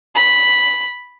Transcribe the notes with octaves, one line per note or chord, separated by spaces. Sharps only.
B5